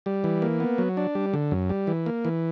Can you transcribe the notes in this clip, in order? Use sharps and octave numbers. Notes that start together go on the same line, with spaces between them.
G3
E3
A#3
B3
F#3
D4
G3
D3
F#2
G3
E3
A#3
E3